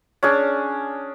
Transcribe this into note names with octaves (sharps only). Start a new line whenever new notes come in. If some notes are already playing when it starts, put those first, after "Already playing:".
C#4 D4 G#4 D5